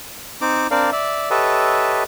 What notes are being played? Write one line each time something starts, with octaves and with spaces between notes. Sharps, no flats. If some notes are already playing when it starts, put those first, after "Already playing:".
C4 D#4 D6
C4 D4 A#4 D5 F5
D5 E5
G4 A4 B4 C#5 D#5 E5